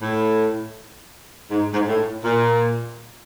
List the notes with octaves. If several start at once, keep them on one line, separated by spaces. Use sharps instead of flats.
A2
G#2
G#2
A2
A#2